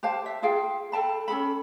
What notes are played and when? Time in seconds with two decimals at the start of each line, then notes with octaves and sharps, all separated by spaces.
0.03 G4 C5 F5 A5
0.26 E5
0.42 F4 G#4 F5 G5
0.92 A4 G5 A5 B5
1.28 C#4 G#4 A4 B5